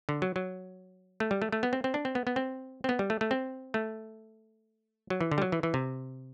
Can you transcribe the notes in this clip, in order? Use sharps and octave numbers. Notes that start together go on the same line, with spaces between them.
D3
F#3
F#3
A3
G3
A3
A3
B3
C4
C4
D4
C4
B3
B3
C4
C4
B3
G3
A3
A3
C4
A3
F#3
E3
D3
G3
F#3
E3
E3
C3